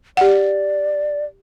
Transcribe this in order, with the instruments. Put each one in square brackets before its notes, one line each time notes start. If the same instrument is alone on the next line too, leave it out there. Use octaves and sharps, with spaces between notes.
[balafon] G4 F#5 [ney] D5